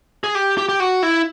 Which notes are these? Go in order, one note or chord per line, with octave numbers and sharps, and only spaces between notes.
G#4
G4
G4
G4
F#4
E4